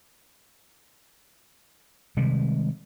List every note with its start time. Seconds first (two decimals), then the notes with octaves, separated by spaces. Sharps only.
2.17 C3 D#3 G3 G#3